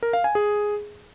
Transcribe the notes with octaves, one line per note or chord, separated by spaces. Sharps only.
A#4
F5
G#5
G#4